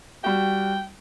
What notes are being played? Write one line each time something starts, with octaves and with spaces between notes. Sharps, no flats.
G3 F#4 G5